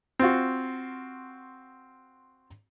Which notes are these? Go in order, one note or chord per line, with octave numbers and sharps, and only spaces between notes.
C4 F4 F#4